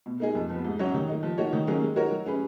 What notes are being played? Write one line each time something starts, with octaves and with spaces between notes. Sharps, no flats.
B2
A#3 D#4 G#4
F2
F3 B3
G#2
F#3 C#4 F#4 C#5
D#3
A#3 D#4
F3
A#3 D#4 F#4 C#5
D#3
F#3 A#3 C#4 G#4
G#3
D#4 F#4 A#4 C#5
F#3
C#4 G#4 B4